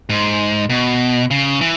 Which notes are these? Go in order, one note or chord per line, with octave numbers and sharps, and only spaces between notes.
G#2
B2
C#3
E3